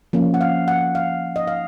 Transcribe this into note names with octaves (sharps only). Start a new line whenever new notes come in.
F3 A#3 C#4
F#5
F5
F#5
F5
D#5
F5